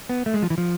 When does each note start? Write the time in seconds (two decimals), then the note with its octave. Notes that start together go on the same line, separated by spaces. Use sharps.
0.09 B3
0.26 A3
0.34 G#3
0.42 F3
0.50 E3
0.58 F3